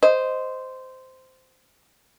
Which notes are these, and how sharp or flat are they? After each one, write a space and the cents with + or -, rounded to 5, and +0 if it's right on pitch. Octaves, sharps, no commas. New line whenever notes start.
C5 -10 D#5 +0